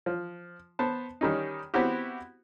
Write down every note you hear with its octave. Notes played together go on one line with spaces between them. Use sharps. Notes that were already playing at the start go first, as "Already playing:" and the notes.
F3
B3 C5 A5
D#3 G3 C#4 D#4
B3 C4 E4 F#4 G4